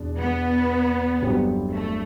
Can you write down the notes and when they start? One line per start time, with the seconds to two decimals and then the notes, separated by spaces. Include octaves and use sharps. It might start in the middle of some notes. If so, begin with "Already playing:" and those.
Already playing: E2 B2 D4
0.19 B3
1.21 G1 G2 F#3 C4 G4
1.73 A3